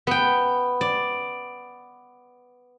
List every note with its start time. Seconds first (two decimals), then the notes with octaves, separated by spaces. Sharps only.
0.07 B3 G5
0.81 D5